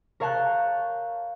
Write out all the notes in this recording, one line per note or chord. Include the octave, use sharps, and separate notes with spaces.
A#4 C#5 F5 A5 F#6 G6